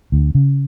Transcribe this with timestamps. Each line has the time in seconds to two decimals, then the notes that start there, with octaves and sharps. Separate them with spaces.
0.12 D2
0.35 C#3